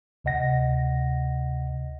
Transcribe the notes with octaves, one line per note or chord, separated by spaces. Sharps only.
D2 C3 D#5 F#5 A#6